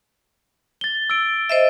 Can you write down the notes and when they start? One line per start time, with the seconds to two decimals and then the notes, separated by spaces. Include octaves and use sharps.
0.81 A6 G7
1.10 E6 D7
1.50 C5 D#5 E5